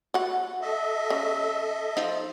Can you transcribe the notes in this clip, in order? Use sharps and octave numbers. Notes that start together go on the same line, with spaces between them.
F#4 F#5
A4 D#5 E5
C#3
F3 D#4 C5